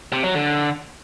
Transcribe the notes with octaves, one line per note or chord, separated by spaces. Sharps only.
C3
F#3
D3